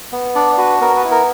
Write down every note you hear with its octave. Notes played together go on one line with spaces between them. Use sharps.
B3
D4 D5
F#4 B4
B3 A#4
B4
E4
A#4